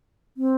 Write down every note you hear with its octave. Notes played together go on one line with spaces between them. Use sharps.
C4